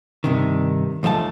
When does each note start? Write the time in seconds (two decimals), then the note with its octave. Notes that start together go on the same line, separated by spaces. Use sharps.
0.24 G2 C3 D#3
1.03 D#2 F3 A3 E5 A5